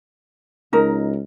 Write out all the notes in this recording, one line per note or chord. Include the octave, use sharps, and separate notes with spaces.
C#2 D#4 A#4